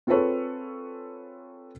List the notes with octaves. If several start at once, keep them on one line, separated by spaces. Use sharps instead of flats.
C4 F4 G#4 A4 B4 C#5